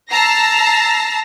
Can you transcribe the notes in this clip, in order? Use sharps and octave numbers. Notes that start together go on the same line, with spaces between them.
A5 A#5 E6 A#6 C7